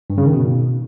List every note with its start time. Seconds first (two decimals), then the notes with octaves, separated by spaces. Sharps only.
0.10 G2
0.18 C#3
0.26 D#3
0.34 B2